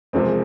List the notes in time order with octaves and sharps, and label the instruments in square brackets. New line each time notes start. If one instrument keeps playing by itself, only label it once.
[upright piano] E1 E2 C3 F3 G#3 C4